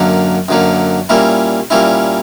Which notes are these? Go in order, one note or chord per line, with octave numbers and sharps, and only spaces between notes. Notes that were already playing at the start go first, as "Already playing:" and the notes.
Already playing: F#2 D3 F#3 A#3
F#2 D3 F#3 A#3
A#2 G3 A#3 C#4 E4
A#2 G3 A#3 C#4 E4